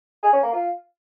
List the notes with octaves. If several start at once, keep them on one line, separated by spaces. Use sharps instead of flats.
G#4
C#4
A#3
F4